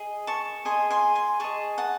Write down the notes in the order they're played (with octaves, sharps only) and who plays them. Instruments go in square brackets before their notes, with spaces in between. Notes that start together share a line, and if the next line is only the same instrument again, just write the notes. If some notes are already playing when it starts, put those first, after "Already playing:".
Already playing: [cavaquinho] G#4 D#5
A5 C#6
G#4 D#5 G#5 C6
G#5 C6
G#5 C6
G#4 D#5 A5 C#6
F#5 A5